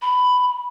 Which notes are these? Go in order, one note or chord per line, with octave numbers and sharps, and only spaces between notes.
B5